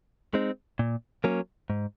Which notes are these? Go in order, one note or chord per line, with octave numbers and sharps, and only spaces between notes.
G#3 C4 D#4
A#2
F#3 A#3 C#4
G#2